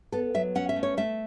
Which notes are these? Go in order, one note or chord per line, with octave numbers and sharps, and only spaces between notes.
B3 A4
F#3 E5
C#4 F#5
E5
A3
C#5
A3 E5